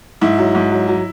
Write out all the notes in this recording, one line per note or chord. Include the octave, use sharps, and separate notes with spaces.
G#2 E4
F#3
G#2
F#3
F#3